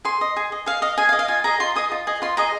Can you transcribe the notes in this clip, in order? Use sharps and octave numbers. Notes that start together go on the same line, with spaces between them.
G#4 C6
D#5
G#4
D#5
G#4 F5
D#5 F5
G#4 G#5
F5
D#5
F5
F4 G#5
G#4 D#5 A#5
F4 C6
G#4 D#5 D#6
F4
G#4 D#5
F4 C6
G#4 D#5 A#5